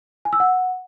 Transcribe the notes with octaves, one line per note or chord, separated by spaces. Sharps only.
G#5
E6
F#5